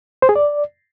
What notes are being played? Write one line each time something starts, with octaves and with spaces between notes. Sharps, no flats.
C5
G#4
D5